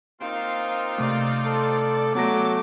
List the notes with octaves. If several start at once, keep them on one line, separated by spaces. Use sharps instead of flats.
A#3 C4 D#4 F4 F5
C3 A3 D5
A4
F#3 A3 B3 D6 A#6